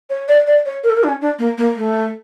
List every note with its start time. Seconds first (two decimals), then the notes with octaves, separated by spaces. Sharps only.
0.10 C#5
0.28 D5
0.47 D5
0.66 C#5
0.84 A#4
0.90 A4
0.96 A#4
1.04 D4
1.08 C#4
1.21 D4
1.39 A#3
1.58 A#3
1.76 A3